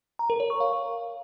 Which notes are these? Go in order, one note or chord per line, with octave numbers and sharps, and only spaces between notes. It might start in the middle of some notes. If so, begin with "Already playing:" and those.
A#5
A#4
C#5
C#6
F5